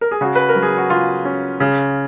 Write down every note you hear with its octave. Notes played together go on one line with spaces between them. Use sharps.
A#4
G#4
C#3 F#4
B4
A#4
F#3
G#4
F#4
C#3 F4
C#4
C#3